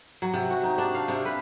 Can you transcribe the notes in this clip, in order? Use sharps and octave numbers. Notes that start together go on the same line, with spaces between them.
F#3
C3
F#4
D#4
D4
F5
C3
B4